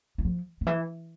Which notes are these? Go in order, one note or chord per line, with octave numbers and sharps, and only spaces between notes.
E3
F3
D3
E3